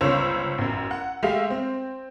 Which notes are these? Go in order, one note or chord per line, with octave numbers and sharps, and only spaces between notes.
G1 C#2 C#4 C5 C#5 E6
A1 F#2
F#5
G#3 A3 G4 E5 F5
C4